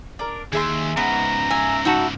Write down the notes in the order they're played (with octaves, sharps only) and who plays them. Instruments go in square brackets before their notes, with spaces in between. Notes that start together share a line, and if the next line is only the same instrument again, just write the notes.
[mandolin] D4 A#4
[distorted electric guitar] D#2 [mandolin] G#4 E5 C6
[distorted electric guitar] G#2 C#3 [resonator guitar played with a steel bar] B3 [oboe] A#5
[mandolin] E5 [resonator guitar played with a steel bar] G#5
[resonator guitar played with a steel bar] D#4 F#4 A5 [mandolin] E5 F#5 B5